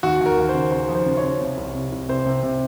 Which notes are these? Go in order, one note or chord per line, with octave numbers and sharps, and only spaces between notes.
D#2 F#4
D#2
A#4
D#2
C5
C#3
C#3 C5
F3
C5
C#3
C#5
C#3
C3
C2
C3
C2
C3 C5
C3
C3